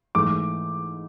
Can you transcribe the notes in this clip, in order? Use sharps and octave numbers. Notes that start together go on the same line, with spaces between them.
G#2 E3 A3 D6